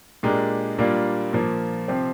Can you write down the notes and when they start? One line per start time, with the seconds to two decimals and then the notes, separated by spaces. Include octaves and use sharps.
0.23 A#2 G#3 D4 G4 A#4
0.79 A#2 G3 A#3 D4 F4
1.33 A#2 F3 A#3
1.88 C3 F3 C4 G4